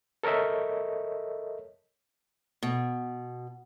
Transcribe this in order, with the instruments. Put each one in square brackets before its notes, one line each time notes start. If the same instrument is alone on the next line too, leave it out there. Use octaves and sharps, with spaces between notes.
[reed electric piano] A4 A#4 C#5 D#5 E5
[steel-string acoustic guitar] B2